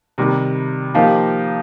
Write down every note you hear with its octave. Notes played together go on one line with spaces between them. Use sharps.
C3 D#3 G3
F3 A#3 D#4 G4